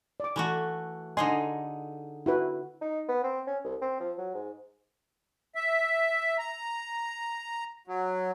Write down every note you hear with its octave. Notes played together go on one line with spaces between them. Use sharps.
D5 D6
E3 A3 F#4
D3 D#4 G#4 D#5 G#5 C6
E4 F#4 B4
D#4
B3
C4
C#4
C2
C4
F3
F#3
G#2
E5
A#5
F#3